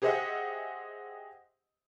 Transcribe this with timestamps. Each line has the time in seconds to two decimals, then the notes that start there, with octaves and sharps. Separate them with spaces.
0.02 G4 G#4 C5 D#5 E5 F#5